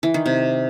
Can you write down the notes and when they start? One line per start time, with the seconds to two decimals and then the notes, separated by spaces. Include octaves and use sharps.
0.03 E3
0.14 D#3
0.26 C3